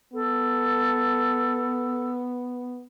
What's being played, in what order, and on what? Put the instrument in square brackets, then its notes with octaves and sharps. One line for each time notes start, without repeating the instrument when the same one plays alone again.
[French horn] B3 [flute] A4